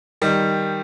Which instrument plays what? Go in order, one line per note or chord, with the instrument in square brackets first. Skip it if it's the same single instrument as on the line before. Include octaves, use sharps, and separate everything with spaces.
[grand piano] D#3 G3